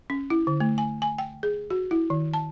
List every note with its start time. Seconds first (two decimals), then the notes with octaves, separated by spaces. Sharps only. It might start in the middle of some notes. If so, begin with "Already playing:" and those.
0.10 C#4
0.30 E4
0.47 D3
0.60 A3
0.78 G#5
1.02 G#5
1.18 G5
1.43 G#4
1.70 F#4
1.91 E4
2.10 D#3
2.34 A5